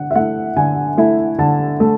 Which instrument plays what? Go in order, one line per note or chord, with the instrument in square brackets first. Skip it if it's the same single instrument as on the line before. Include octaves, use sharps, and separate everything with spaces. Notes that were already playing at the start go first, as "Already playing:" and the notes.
Already playing: [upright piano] D3 F#5
E5
A3 E4 F#5
D3 G#5
A3 E4
D3 A5
A3